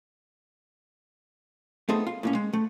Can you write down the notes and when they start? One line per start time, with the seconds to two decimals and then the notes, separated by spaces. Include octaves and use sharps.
1.89 A3 B3 C4 D#4 G#4 A4
2.07 F4
2.23 A2 A#3 C#4
2.35 G#3
2.53 A3